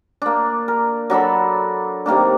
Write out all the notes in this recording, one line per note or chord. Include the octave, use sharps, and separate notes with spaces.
A#3 D4
A#4
F#3 D4 A4 B5
C3 D#3 A#3 D4